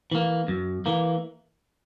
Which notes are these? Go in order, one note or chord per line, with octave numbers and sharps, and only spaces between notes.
E3 A#3
F#2
E3 A#3